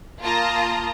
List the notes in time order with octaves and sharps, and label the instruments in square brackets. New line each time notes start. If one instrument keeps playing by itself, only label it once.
[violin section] A#3 F4 A5 A#5 D#6